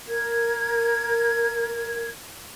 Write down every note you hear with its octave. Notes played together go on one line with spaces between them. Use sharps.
A#4 G#6